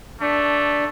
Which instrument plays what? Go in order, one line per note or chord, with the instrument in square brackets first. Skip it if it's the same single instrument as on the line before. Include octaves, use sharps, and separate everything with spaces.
[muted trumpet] A3 [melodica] D4